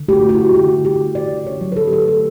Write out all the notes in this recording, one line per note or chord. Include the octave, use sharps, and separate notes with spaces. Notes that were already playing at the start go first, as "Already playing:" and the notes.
Already playing: D3
A3 F#4 G4
A3
F#4
E4
D3
F#4
D3 G4
D3
D3 G4
D3
D3 D5
D3
D3 C#5
F#3
B4
F#3 A4
G4
A3 A4
D3 A4